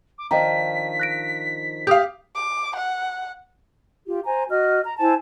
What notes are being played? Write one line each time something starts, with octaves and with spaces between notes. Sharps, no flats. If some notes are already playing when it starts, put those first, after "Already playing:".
D6
D#3 F3 D4 D#5 G5 A#5 B6
F#6 A#6 D7
G4 F5 D#6 G6
D6
F#5
F4 G4
C5 G#5 A#5
F#4 D#5 F6
A#5
E4 C5 G#5 A5